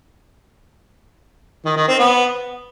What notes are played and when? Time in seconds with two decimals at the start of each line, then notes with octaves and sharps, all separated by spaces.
1.66 D#3
1.77 D#3
1.88 C4
1.99 B3